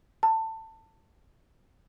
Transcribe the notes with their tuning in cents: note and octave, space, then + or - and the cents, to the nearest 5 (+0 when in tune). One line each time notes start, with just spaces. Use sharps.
A5 +20